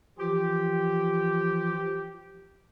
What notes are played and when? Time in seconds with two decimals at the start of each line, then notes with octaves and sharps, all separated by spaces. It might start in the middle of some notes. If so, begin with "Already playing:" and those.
0.19 E3 F3 F4 G4